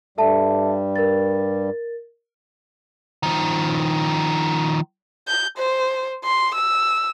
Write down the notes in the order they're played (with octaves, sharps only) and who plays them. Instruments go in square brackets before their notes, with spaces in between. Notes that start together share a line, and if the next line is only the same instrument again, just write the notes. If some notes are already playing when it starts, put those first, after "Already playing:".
[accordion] G2 G3 [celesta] A4 E5 A5
[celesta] A#4 A6
[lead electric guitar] D#3 F3
[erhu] G6
C5
C6
E6